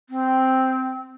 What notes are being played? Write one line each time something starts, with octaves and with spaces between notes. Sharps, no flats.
C4